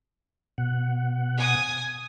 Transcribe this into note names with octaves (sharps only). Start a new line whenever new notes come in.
B2 F#5
G#5 D#6